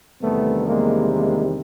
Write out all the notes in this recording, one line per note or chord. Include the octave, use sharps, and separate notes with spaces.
E2 C3 D#3 G3 A3 B3
G#3 A#3
G#3 A#3